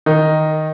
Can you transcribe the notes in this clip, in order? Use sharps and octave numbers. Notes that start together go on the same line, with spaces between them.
D#3 D#4